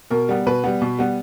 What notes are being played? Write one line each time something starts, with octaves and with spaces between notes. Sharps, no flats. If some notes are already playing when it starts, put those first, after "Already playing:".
B2 A#4
G3 B3
B2 B4
G3 B3
B2
G3 B3